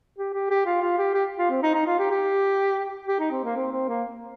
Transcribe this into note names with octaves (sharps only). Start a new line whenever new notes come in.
G4
G4
G4
F4
F4
G4
G4
F4
C4
D#4
D#4
F4
G4
G4
G4
D#4
C4
A#3
C4
C4
A#3